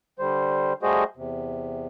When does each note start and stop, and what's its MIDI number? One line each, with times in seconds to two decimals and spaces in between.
0.19 0.73 50
0.19 0.73 55
0.19 0.73 72
0.83 1.04 55
0.83 1.04 57
0.83 1.04 66
0.83 1.04 68
0.83 1.04 72
0.83 1.04 75
1.17 1.87 40
1.17 1.87 48